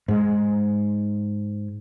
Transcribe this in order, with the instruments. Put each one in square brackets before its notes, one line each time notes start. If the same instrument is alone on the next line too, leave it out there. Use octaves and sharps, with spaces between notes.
[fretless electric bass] G#2 G#3